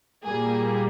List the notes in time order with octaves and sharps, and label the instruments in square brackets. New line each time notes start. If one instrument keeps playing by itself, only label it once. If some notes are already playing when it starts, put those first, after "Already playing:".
[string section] A#2 G3 A#3 G#4